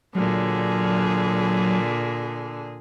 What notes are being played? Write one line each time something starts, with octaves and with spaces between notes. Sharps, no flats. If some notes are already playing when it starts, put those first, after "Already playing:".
A#2 D3 F#3 G#4